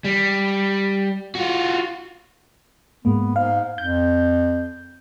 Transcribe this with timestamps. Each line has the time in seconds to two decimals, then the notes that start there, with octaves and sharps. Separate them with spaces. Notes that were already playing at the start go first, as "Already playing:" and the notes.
0.05 G3
1.35 F4 F#4
3.05 G#2 G#3 A#3 B3
3.36 G#2 F5
3.78 F2 G6